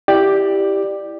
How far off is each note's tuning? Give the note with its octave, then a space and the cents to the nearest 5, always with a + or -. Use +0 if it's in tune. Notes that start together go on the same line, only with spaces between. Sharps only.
E4 +0 G4 +0 D5 +15